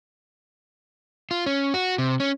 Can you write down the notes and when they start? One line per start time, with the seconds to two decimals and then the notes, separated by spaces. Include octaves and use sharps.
1.31 F4
1.46 C#4
1.74 F#4
1.98 C3
2.20 C#4